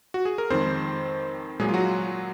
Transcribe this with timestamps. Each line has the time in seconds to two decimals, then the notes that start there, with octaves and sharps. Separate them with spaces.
0.14 F#4
0.25 G#4
0.38 A#4
0.50 F2 D#3 G#3 C4 C5
1.59 A#2 F#3 G#3 G#4
1.68 F4
1.74 F#3 F#4